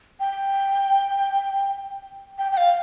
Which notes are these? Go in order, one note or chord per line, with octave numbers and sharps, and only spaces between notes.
G5
G5
G5
F5